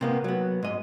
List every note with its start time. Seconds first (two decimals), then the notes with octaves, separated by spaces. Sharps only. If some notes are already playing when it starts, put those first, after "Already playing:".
0.01 C3 A#3 B3
0.24 F#3 B3
0.63 G#2 D#5